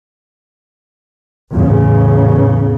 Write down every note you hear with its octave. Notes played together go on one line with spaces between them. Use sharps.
E2 A2 C#3